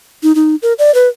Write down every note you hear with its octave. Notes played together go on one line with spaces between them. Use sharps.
D#4
D#4
A#4
D5
B4